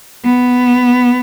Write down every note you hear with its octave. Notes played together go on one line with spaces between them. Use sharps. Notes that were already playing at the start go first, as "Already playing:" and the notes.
B3